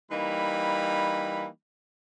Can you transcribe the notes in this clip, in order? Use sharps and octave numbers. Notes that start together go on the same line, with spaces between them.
E3 G3 A#3 D#4 B5